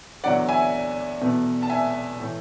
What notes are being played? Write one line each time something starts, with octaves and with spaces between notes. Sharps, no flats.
E2 D3 F#3 A3 D5 F#5
E5 G#5
E2 B2 A3
A5
E5 G#5
A2 E3 A3